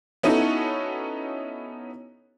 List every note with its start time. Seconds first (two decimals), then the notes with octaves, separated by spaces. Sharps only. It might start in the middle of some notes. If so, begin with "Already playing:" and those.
0.23 B3 C#4 D#4 E4 F#4 A4